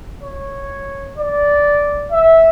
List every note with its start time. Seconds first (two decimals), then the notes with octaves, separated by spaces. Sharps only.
0.23 C#5
1.18 D5
2.12 E5